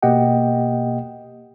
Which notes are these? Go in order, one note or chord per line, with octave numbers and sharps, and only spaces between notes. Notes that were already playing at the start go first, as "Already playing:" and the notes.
B2 A#3 G4 D#5 F#5 G5